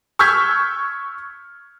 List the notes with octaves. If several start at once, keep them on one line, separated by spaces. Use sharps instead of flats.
C#6 E6 F6 G6 G#6 B6